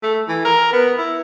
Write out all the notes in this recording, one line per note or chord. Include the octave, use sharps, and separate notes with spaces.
A3
E3
A#4
B3
E4